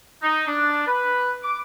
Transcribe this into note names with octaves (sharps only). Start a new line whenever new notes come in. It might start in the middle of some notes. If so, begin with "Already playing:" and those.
D#4
D4
B4
D6